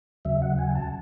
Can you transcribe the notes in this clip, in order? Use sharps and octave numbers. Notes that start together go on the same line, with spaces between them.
D#2 C#3 F#3 E5
F#5
G#5
A5